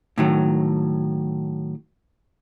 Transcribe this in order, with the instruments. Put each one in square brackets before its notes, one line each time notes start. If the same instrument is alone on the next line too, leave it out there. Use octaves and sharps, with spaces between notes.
[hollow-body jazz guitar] A2 D#3 F#3